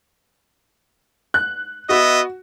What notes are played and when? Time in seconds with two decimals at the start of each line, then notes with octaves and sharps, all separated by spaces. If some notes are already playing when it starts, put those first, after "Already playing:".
1.34 F#6
1.89 B3 F#4 D#5 E5